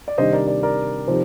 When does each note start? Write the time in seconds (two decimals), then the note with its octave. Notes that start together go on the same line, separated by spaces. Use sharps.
0.08 D5
0.18 C3 D#3 G3 D4 C5 D#5
0.33 A#4 D5
0.47 A#4 D5
0.63 A#4 D5
1.07 C3 F3 C4 D#4